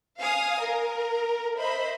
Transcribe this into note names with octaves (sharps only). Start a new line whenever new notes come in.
F5 G#5 D#6
A#4
C5 D#5 E5 B5